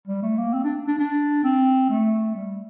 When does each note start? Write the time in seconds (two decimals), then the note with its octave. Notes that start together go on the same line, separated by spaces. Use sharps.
0.07 G3
0.22 A3
0.38 A#3
0.53 C4
0.64 D4
0.87 D4
0.99 D4
1.44 C4
1.90 A3
2.35 G3